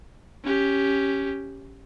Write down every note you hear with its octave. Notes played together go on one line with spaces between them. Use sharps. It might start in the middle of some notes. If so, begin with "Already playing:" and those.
C#4 G4